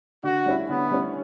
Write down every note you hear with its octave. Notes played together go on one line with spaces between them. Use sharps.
D3 F#4
G3 C#4 E4
D3 B3
G3 C#4 E4